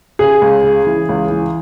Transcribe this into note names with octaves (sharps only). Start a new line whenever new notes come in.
C#3 G#4
C#2
C#3
E3
C#2
E3